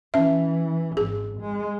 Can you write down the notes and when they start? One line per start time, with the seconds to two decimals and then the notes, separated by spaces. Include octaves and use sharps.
0.14 E3 C#4 E5
0.97 G#1 G#4
1.41 G#3